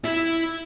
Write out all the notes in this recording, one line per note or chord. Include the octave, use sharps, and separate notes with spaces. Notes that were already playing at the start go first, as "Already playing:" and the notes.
E4